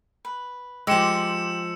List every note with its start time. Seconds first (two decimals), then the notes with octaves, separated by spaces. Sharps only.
0.25 B4
0.87 F3 G#3 G4 C6 D6 E6 C#7 E7